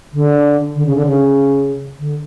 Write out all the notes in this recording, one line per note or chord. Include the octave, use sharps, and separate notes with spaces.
D3
D3
C#3
D3
C#3
D3